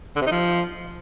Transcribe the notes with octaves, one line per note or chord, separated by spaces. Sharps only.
D3
C3
D#4
F3